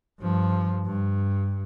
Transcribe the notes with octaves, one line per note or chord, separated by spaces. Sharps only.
G2 F3
G2